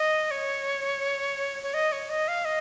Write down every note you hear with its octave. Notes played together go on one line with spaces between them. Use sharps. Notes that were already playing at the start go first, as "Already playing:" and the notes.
Already playing: D#5
C#5
C#5
D#5
C#5
D#5
F5
D#5